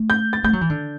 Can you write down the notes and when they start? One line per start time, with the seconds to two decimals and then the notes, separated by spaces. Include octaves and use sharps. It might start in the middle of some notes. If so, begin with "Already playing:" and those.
Already playing: A3
0.10 G6
0.33 A6
0.43 A3 G6
0.53 F#3
0.61 E3
0.70 D3